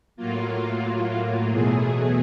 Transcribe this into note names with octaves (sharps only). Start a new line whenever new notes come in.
A2 F#3 A#3 F4
E2 B2 F#3 A3 G#4